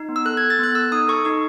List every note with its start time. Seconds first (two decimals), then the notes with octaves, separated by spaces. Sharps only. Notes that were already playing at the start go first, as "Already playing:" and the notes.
Already playing: D#4
0.09 B3
0.16 E6
0.25 A4 F#6
0.37 G#6
0.42 A4
0.50 A6
0.59 B3 F#6
0.75 A4 E6
0.92 D#4 D#6
1.08 A4 C#6
1.25 D#4 C#6